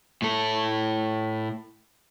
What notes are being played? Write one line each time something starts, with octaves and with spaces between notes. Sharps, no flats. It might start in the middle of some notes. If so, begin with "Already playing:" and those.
A2 A4